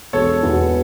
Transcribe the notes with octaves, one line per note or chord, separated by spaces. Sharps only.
E1 A4 C#5
E2 B2 B3